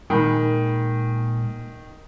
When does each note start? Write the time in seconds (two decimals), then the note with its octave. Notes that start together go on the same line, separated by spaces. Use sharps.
0.10 A#2 D#3 G#3 B5